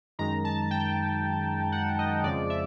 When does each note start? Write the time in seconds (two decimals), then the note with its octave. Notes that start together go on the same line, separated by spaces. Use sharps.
0.19 F#2 D#3 G#3 A#5
0.35 A#5
0.44 A5
0.71 G5
1.72 F#5
1.99 D#5
2.23 F2 C#3 F3 G#3 D5
2.50 E5